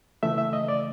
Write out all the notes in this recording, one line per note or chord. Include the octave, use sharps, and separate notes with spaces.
C#3 E3 A3 E5
E5
D#5
D5